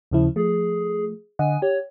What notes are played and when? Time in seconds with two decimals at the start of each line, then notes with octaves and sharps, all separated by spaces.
0.11 D#2 C#3 F3 E4
0.36 F3 A3 G#4
1.39 D3 D#5 F#5 G#5
1.62 G4 C#5